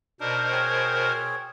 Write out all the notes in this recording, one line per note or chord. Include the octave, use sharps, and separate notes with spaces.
B2 D4 D#4 A#4 C5
C4 G#4 C#5